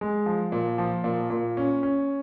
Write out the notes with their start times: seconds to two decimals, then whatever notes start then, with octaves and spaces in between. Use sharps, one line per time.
0.01 G#3
0.26 F3
0.52 A#2
0.78 F3
1.04 A#2
1.30 A#2
1.57 C#4
1.83 C#4